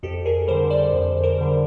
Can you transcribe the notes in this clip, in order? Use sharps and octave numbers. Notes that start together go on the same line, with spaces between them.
F2 G4 A4
G#4 A#4
D3 G3 A#4 C5
C5 D5
F2
A#4 C5
D3 G3